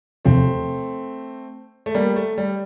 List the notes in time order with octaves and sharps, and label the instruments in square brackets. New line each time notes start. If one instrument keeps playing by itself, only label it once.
[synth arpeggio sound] E2 C3 F3 [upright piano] A3 C4
[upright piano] A3
G3 A#3
A3
G3